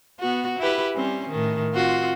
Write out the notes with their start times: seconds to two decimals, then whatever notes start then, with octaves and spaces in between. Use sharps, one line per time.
0.20 B3 F#4
0.59 E4 G4 B4
0.95 G3 C4 C#4
1.30 A2 D#3
1.73 C4 F4 F#4